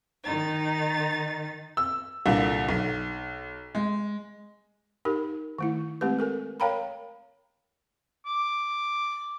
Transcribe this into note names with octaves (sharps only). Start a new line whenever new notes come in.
D#3 D#4 A6
E6
C2 A#2 D3
B1
G#3
D#4 G4 A#4
D#3 A3 E4
G#3 A3 C4 G4 B4
A4 A#4 G#5
A#4 C#5 F5 G5 A#5 B5
D6